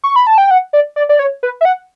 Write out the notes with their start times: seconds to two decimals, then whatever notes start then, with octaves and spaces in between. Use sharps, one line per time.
0.04 C#6
0.16 B5
0.27 A5
0.38 G5
0.51 F#5
0.73 D5
0.96 D5
1.09 D5
1.19 C#5
1.43 B4
1.61 E5
1.65 F#5